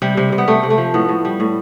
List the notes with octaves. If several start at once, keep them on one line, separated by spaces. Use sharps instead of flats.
C3 G3
C3
C3
B3
C3 A3
C3
A3
F3
A2 B3
A2
G3
A2